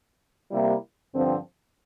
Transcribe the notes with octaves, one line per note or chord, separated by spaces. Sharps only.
C3 G3 A#3 E4
G2 D3 F3 C4